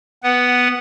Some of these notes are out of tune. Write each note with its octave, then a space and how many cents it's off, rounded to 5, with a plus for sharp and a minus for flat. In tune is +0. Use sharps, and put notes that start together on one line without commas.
B3 +0 B4 +0 F#5 +10